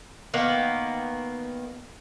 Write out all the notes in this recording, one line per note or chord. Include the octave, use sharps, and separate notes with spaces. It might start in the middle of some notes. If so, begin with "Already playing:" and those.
D#3 A#3 B3